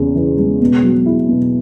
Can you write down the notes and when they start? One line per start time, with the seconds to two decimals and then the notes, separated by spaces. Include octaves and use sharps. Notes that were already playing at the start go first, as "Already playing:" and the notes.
Already playing: E2 C#3
0.15 E3
0.38 G#3
0.61 B2
0.83 F#3
1.06 E4
1.28 B2